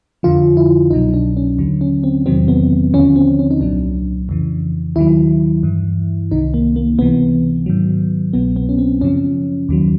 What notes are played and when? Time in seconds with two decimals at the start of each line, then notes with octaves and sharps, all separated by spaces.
0.23 F2 D3 F3 F4
0.57 E4
0.91 C2 B2 F#3 D#4
1.14 D4
1.37 C#4
1.58 D#2 D3 F#3
1.81 C#4
2.03 C4
2.26 E2 C3 D#3 F#3 C4
2.48 B3
2.94 D#2 D3 F3 C#4
3.16 C4
3.39 C#4
3.51 D#4
3.61 C2 A#2 F#3 D4
4.29 F2 C#3 E3
4.96 D#2 D#3 F#3 E4
5.63 G2 E3
6.31 C2 C3 D#3 D#4
6.54 A#3
6.76 A#3
6.99 C#2 C3 E3 B3
7.66 G#2 D#3 F#3
8.33 C2 B2 F#3 B3
8.56 B3
8.69 C#4
8.78 C4
9.01 F#2 C#3 F3 C#4
9.69 D#2 D#3 F#3